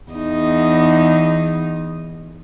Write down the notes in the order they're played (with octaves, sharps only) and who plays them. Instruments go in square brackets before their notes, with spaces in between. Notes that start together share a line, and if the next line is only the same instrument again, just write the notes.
[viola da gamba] E2 D#4